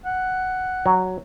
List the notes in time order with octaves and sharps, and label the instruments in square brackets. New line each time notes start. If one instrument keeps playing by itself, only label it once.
[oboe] F#5
[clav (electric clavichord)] F#3